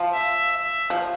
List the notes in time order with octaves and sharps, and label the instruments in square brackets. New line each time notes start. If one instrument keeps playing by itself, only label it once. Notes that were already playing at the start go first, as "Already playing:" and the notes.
Already playing: [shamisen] F3
[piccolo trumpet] E5
E5
[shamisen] F3